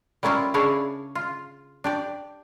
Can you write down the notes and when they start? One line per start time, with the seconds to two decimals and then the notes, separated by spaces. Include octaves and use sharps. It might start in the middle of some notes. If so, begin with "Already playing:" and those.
0.23 G3 A#3 C#4 E4 F4
0.54 C#3 D4 E4 G#4 C#5 F5
1.15 F4
1.84 D4 G4 D5